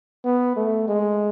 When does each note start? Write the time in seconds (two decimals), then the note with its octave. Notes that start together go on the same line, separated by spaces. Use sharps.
0.25 B3
0.56 A3
0.88 G#3